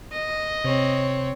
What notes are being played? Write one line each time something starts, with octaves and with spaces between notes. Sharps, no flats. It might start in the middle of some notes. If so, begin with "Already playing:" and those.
D#5
C3 C4 C#5